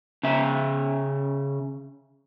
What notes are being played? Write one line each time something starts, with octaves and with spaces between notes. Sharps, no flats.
C#3 E5